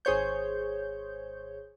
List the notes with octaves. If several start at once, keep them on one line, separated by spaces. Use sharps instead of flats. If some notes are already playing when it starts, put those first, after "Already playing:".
G#1 G#4 C5 C#5 G6